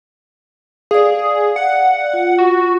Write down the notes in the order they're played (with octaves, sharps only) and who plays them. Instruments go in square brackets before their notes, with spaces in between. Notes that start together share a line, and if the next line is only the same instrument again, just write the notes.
[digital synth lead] G#4 [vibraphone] D5 F5
[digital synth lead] F#5
[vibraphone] F4
[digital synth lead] F#4